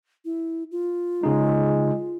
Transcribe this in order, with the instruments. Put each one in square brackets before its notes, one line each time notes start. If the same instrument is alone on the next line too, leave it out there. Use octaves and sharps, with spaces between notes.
[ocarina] E4
F4
[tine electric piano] C#3 D#4 [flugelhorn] G#3